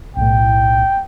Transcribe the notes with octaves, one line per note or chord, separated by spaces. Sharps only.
B1 A2 G5